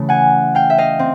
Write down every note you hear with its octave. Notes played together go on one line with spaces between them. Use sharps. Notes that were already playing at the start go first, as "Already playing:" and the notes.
Already playing: C#3 E3 A3
F#5 G#5
F5 G5
E5
D#5 F5
C4